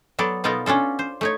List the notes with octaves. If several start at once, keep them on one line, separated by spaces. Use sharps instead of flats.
F#3 B3 A4 D5
B2 B3 D#4 F4 A4 A#4
C#4 D4 F4 A4
C5
A3 D#4 C#5